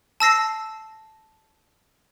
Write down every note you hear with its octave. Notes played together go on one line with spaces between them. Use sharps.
A5 E6 A#6 C7